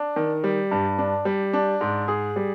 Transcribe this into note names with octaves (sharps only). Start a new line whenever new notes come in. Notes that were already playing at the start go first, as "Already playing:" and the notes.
Already playing: D4
D#3
G3
G2
D4
G3
D4
G#2
G#4
G3